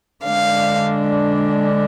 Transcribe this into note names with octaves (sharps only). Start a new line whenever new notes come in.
D3 G#3 D4 F5